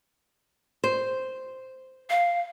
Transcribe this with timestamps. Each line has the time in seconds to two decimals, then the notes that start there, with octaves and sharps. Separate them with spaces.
0.84 C5
2.10 F5